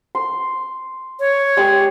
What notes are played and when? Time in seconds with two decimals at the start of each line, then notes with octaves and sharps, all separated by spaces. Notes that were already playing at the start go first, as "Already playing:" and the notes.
0.15 C6
1.20 C#5
1.57 G#3 G4 G#4